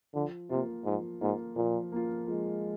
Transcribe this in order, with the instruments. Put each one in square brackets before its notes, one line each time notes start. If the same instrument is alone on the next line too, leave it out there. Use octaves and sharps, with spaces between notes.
[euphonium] D3 [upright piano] F3
[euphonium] C3 [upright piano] A#3 F4
[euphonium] G#2 [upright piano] F3
[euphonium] G#2 [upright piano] A#3 F4
[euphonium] A#2 [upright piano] F3
[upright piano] A#3 F4
[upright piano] F3 [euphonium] G#3